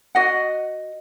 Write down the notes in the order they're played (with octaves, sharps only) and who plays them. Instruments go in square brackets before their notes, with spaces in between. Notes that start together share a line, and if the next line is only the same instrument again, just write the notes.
[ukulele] F#4 D#5 F#5